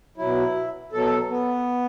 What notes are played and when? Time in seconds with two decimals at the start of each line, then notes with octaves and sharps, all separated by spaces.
0.17 B2 F#3 E4
0.92 B2 F#3 A4
1.30 B3